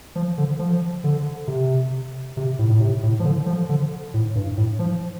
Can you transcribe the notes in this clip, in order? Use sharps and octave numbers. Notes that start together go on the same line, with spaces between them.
F3
D3
F3
D3
C3
C3
A2
A2
C3
A2
F3
D3
F3
D3
A2
G2
A2
F3